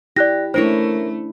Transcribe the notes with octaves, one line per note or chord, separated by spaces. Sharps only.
E4 G4 D5 F#6 A#6
A3 A#3 C#4 D4 E4 A#4 C5 C#5